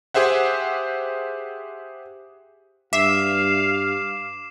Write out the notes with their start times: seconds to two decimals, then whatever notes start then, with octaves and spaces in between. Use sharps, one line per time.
0.14 G4 G#4 C5 E5 F#5
2.93 G2 E5 F5 D6 C7 E7